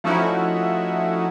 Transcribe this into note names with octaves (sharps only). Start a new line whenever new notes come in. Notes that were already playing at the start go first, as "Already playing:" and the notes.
F3 A3 C#4 D#4 E4 F#4